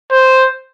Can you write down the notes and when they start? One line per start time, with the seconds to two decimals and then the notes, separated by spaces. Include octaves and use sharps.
0.12 C5